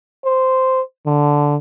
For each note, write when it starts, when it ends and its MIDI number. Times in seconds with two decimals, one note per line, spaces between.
0.25 0.81 72
1.06 1.56 50